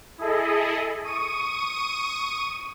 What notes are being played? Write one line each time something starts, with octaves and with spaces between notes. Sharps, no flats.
E4 G#4 A4 D#5
C#6 D#6 D#7